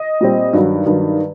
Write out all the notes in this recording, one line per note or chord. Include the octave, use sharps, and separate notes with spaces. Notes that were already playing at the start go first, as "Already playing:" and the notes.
Already playing: D#5
A#2 G3 C4
G2 D#3 F#3
G2 D#3 F#3